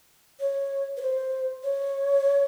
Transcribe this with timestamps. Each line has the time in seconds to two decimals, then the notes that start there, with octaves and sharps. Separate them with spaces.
0.40 C#5
0.97 B4
1.02 C5
1.63 C#5